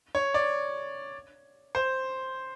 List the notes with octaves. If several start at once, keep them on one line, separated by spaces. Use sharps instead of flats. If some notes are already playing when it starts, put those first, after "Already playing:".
C#5
D5
C5